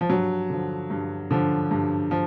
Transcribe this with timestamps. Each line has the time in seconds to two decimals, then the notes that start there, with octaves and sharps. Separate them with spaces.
0.01 F3
0.10 G2 F#3
0.50 D3 F3
0.90 G2
1.31 D3 F3
1.71 G2
2.11 F3